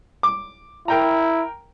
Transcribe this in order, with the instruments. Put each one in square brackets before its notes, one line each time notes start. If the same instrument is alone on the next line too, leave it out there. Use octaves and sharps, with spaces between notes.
[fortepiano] D6
[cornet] E4 [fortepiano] A#4 G5 A#5